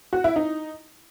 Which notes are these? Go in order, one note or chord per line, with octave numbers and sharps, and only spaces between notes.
F#4
E4
D#4